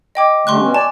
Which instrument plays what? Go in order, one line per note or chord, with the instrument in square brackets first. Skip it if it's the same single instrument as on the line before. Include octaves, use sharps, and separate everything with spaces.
[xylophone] D#5 G5 D6
[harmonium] D3 G3 A3 [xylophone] C6 C#6 F#6
[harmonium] B2 C#4
[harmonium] D5 G#5 [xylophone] A5